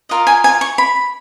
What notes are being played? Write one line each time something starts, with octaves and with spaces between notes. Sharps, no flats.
F4 A#4 D#5
G#5
G#5
C#6
B5